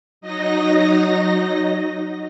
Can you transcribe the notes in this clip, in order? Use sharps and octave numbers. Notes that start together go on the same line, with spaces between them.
F#3 D#4 D#5 A#6